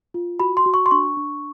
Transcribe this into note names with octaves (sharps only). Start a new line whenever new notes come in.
F4
F#4 B5
C6
F#4
C#6
C6
D4 C#6
D4